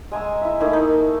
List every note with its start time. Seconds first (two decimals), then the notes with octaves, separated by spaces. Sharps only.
0.12 G#3 G#5 A#5 E6
0.41 E4 E5
0.60 A3 A#3 D#4 E4
0.73 D#4